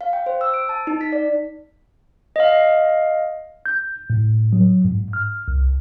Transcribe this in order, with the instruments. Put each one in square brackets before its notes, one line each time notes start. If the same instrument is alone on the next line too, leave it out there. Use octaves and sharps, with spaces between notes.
[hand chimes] F5
G5
C5
E6
D7
A5
D#4
B6
D5
[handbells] D#5 F5
[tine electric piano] G6
A2
F#3
G#2
F6
C2